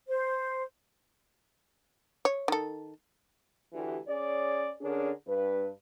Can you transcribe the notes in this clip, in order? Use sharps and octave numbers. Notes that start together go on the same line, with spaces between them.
C5
C#5
D#3 A4
D2 E3 G4
C#4 G#4 C#5 D5
D3 C#4 D4 G#4 A#4 C#5
G2 B4